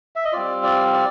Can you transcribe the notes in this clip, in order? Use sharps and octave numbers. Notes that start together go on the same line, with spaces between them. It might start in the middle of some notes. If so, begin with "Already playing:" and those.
E5
D#5
G3 C4 F4 D5
D5
D5